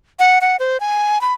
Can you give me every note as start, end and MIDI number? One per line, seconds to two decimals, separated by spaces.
0.19 0.39 78
0.41 0.56 78
0.60 0.80 72
0.80 1.21 80
1.21 1.34 83